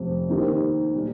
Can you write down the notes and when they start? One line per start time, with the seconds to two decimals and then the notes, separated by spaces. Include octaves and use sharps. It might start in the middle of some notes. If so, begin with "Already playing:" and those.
Already playing: F1 F2 C3 F3 C4
0.29 D#2 D#3 C4 D#4 G4
0.94 A#2 G3